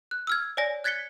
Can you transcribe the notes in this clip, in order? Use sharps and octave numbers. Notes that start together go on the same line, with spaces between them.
F#6
E6 F6 G#6
C#5 D5 G#5 A#6
F#6 G#6 A6 B6 C#7 G7